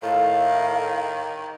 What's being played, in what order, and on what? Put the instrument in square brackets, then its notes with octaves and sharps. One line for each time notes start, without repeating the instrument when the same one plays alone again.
[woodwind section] A2 [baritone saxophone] D#3 [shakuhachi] F5